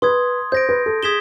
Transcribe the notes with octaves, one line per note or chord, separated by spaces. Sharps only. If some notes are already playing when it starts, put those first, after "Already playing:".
B4 C6 D#6 G#6
C5 G6 A#6 D7
B4
A4
G#4 D#6 G#6 B6 E7 G7